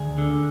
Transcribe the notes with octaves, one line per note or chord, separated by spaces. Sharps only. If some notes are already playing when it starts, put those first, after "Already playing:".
Already playing: D2 G#4
D3